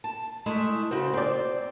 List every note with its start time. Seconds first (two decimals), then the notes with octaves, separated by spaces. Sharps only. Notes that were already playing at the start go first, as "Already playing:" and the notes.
0.04 A5
0.46 G#3 A3 E4
0.91 C#3 F#4 C5
1.14 C4 D5